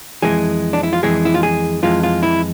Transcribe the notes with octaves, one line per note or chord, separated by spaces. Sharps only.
F2 E3 G#3 G#4
D4
E4
F4
F2 E3 G#3 G#4
E4
F4
G#4
F2 E3 G#3 F4
F4
E4